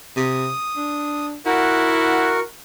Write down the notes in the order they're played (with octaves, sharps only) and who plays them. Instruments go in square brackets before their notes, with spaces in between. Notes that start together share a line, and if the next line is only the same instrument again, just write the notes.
[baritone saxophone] C3 [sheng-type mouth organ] D#6
[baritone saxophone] D4
[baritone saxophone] E4 [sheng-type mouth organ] F#4 A#4 F#5